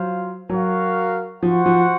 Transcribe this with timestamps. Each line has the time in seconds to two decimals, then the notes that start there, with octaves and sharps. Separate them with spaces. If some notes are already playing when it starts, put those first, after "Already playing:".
Already playing: F#3 F4 C5 F5
0.49 F#3 F#4 A#4 F5
1.42 F3 F#4 C5 F#5
1.66 F3